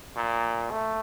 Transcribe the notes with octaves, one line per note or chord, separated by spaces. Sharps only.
A#2
A3